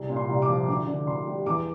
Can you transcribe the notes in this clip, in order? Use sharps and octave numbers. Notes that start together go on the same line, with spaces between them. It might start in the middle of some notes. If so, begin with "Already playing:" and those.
Already playing: C2
A#2
C6
C2
D6
F3
D2 D6
D3
D2 C6
G3
E2 D6